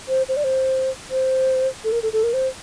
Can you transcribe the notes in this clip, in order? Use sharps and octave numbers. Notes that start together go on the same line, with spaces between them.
C5
C5
D5
C5
C5
A4
A#4
A4
A4
A#4
C5